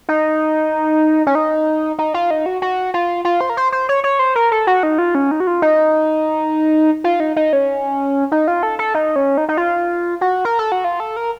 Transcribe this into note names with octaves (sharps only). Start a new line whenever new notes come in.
D#4
C#4
D#4
D#4
F4
D#4
F#4
F#4
F4
F4
C5
A#4
C5
C5
C#5
C#5
C5
A#4
A4
F#4
D#4
F4
C#4
D#4
F#4
F4
D#4
F4
D#4
D#4
C#4
D#4
F4
A4
A4
D#4
C#4
D#4
D#4
F4
F#4
A#4
A4
F#4
F4
A4
A#4